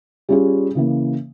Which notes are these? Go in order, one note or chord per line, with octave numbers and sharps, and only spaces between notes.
G3 C#4 F4 G#4
C#3 E3 A#3